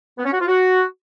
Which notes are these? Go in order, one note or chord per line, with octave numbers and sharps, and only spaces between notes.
B3
C#4
F#4
F4
F#4